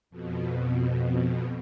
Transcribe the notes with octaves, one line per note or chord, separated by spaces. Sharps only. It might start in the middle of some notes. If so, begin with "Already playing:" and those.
F2 B2